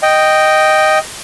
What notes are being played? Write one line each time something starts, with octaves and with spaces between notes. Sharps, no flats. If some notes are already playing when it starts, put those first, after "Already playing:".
D#5 G5